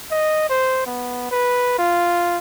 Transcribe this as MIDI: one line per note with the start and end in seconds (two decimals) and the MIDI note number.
0.11 0.49 75
0.49 0.84 72
0.86 1.26 59
1.31 1.74 71
1.78 2.38 65